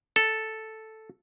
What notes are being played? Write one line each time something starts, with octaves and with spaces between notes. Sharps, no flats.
A4